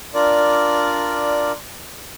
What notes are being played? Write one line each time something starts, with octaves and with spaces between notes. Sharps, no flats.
D4 F4 A#4 D5